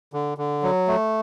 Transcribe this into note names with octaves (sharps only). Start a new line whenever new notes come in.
D3
D3
F#3
A3